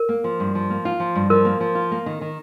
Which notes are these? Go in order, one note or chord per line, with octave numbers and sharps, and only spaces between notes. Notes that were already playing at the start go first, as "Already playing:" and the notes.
Already playing: A#4
A#3
F3
G2
F3
A#3
F4
F3
G2
F3 A#4
A#3
F3
F4
A#3
D#3
D#3